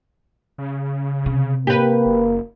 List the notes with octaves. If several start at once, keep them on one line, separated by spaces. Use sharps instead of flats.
C#3
C3
A#3 G4 B4
F#1